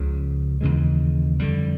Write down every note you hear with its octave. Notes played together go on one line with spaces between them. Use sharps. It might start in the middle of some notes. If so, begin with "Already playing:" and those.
Already playing: C#2 C#3 F3
D#2 C#3 E3 G#3
F2 D3 G3